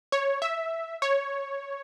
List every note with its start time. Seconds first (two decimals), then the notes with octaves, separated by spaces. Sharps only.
0.12 C#5
0.42 E5
1.02 C#5